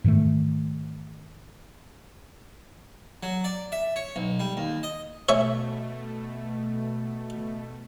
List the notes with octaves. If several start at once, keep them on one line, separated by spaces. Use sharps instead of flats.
G#2 D#3 E3 A3
F#3
D5
E5
C#5
B1
G3
D#2
D#5
B2 A3 C#5 E5 G#5